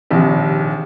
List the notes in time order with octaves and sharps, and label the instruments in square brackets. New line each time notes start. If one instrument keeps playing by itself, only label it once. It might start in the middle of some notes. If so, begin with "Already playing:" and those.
[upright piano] A#1 D#2 C3